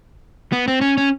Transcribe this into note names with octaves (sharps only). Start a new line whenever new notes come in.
B3
C4
C#4
C#4